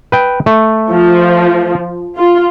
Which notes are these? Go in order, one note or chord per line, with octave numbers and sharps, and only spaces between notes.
B4 G5
A3
F3
F4